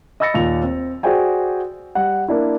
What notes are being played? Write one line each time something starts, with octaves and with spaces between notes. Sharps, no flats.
D#5 B5 E6 A6 A#6 C#7
D#2 A#2 F7
C4
F#4 G#4 C5 D5 G5 G#5
G3 F#5
A#3 D4 E4